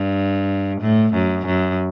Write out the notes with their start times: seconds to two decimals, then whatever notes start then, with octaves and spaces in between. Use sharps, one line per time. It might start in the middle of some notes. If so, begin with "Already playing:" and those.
Already playing: G2
0.81 A2
1.13 F#2
1.45 F#2